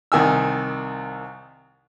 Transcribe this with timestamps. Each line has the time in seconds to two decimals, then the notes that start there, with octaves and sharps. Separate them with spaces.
0.12 C2 D#3 G#5 E6